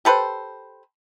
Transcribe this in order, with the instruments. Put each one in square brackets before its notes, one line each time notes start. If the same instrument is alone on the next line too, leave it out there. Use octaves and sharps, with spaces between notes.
[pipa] G4 A4 B4 C5